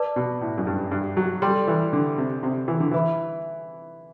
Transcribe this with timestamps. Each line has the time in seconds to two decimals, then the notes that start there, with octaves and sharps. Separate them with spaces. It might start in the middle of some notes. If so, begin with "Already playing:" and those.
Already playing: B4 D5 A5 D6
0.16 B2
0.41 A2
0.58 F#2
0.67 G2
0.91 G2
1.17 F#3
1.42 G3 A4 D5 G5 C6
1.68 E3
1.93 D3
2.18 C3
2.43 C3
2.68 E3
2.80 D3
2.91 E3 B4 E5 B5